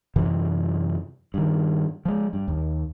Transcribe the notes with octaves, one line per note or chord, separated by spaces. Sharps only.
F#2 C3 E3
G2 D#3
F3 G#3
G2
D#2